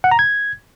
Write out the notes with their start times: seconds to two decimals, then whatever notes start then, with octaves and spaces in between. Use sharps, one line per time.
0.04 F#5
0.11 A#5
0.19 G#6